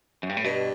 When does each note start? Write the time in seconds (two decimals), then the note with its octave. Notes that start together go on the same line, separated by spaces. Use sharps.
0.23 F#2
0.29 G2
0.37 A2
0.44 G2 B2